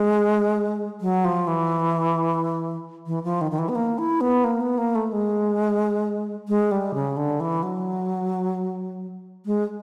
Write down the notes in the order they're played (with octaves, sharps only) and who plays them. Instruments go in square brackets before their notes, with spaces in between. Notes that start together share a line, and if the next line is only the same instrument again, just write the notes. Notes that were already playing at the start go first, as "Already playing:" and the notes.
Already playing: [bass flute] G#3
F#3
F3
E3
E3
F3
D#3
D#3
E3
B3
A#3
E4
B3
A#3
B3
A#3
A3
G#3
G#3
G3
C#3
D3
E3
F#3
G#3